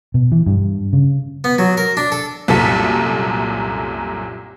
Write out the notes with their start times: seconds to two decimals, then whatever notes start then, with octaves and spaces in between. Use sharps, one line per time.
0.14 B2
0.32 E3
0.46 G2
0.93 C#3
1.44 B3
1.58 F#3
1.77 A#4
1.97 D4
2.12 A4
2.48 C2 F#2 A#2 A4 B6